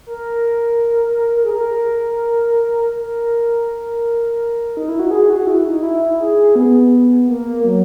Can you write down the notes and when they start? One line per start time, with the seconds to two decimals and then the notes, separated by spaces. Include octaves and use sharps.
0.07 A#4
1.43 G#4
1.50 A#4
2.94 A#4
4.77 D#4
4.89 E4
4.99 F#4
5.11 G#4
5.30 F#4
5.47 E4
5.66 D#4
5.83 E4
6.20 G#4
6.56 B3
7.28 A#3
7.64 F#3